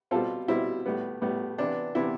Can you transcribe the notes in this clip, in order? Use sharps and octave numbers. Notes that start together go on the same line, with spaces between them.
B2 G3 C4 F4 A4
B2 G3 C4 E4
A2 G3 B3
A2 G3 B3
C3 E3 B3 D4
C3 E3 B3 E4